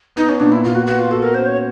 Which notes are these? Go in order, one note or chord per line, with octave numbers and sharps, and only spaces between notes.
B3 D#4
C#4
A#2 D4
E4
A#2 F4
F#4
B3 F#4
F4
F#4 A4
A#4
C#4 C5
C#5